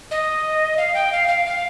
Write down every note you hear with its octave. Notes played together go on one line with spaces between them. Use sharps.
D#5
F5
G5
F5
F5
F5